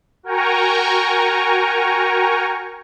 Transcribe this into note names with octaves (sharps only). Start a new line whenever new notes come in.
F#4 A#4 G5 G#5 A#5 C#6